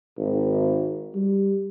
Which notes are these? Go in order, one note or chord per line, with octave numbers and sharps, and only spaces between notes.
G#1
G3